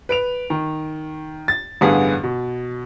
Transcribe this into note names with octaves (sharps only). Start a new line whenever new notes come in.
B4 D7 F7
D#3
A6
A1 G2 D3 B3 G#4 F5
B2